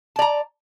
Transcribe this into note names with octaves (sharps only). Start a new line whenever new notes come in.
D5 A5 A#5